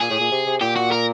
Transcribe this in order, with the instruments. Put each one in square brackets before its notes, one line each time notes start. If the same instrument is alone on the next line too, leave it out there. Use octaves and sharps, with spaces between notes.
[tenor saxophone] A#2 [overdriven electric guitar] G#4
[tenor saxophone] A2
A#2
C3
C3
[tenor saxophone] A#2 [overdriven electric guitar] G4
[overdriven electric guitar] F#4
A#4